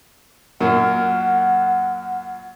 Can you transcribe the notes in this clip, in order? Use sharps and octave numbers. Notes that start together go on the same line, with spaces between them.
F#2 A#2 F#5